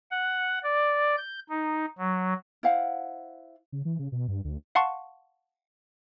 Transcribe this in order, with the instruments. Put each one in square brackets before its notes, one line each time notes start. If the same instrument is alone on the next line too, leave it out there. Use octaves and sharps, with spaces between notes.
[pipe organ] F#5
D5
G6
D#4
F#3
[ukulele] E4 C5 F5 F#5
[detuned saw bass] C#3
E3
C#3
B2
G2
D2
[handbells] F5 F#5 A5 C6 C#6